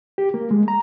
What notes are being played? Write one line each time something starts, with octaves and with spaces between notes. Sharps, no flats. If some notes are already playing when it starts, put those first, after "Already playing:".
G4
A#3
G#3
A#5